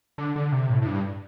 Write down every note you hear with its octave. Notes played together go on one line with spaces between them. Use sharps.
D3
D3
C3
A2
A2
G2